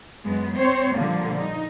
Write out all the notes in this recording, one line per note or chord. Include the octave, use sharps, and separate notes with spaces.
F#2 G#3 B3
C4 C5 C#5
A#2 D3 F3 G3 A#3
D#4